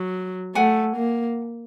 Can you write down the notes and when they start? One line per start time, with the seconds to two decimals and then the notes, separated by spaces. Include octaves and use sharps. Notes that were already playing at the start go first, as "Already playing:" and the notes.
Already playing: F#3
0.55 A3 F#5 G#5
0.96 A#3